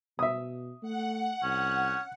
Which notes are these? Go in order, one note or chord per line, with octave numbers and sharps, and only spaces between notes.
B2 E5 D#6
A3 F#5
C2 C#4